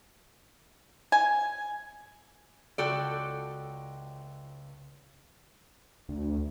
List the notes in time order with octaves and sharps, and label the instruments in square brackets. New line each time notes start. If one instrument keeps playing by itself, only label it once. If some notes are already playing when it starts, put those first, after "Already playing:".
[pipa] G#5
[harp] C#2 G5 C#6 [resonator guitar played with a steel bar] F#4 A4 D5
[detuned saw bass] D2